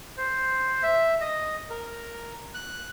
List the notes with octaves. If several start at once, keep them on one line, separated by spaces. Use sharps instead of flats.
C5
E5
D#5
A#4
F#6